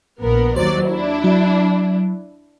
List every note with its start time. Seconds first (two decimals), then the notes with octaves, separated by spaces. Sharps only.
0.20 A#1 B3 A#4
0.56 D#2 F#3 C5 D5
0.87 D4 E4
1.24 F#3